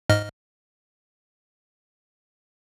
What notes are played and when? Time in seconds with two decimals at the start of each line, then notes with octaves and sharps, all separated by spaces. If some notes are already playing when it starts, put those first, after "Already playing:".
0.10 G#2 D#5 F6